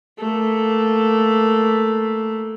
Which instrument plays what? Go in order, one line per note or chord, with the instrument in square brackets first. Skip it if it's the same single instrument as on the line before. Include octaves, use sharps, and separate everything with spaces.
[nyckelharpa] A3 A#3